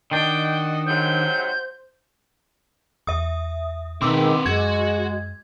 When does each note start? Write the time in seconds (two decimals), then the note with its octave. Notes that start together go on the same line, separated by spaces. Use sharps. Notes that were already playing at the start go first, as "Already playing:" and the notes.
0.11 D#3 D4 F#4 D#5 G5
0.87 G#2 C3 F#3 C5 G6
3.07 E2 E5 D#6
4.02 B2 D#3 G#3 C4 B4 C6 D6 E6
4.46 F#2 G#3 F#4 G#6